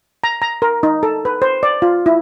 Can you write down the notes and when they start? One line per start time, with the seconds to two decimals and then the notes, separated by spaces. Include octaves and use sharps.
0.24 A#5
0.42 A#5
0.62 A#4
0.83 D#4
1.03 A4
1.25 B4
1.42 C5
1.63 D5
1.82 F4
2.06 E4